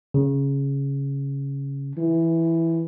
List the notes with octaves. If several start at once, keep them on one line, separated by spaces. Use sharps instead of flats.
C#3
E3